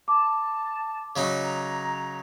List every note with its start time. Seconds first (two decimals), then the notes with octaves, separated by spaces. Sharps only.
0.08 A5 D6
1.16 C#3 F#3 D#4
1.44 A#5